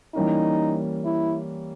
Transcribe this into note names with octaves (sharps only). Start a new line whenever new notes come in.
E3 G3 A#3 C#4 D#4
E4